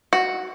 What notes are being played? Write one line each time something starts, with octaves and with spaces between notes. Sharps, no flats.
F#4